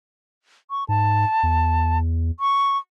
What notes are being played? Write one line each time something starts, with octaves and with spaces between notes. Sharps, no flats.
C#6
G#2 A5
E2
C#6